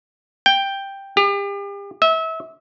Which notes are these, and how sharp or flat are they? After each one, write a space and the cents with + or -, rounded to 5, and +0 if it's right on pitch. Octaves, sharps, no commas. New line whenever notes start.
G5 +5
G4 +40
E5 -30